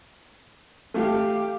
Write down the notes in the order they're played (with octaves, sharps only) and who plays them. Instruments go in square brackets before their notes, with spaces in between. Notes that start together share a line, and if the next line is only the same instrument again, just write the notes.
[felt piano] A3 [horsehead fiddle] G4 F5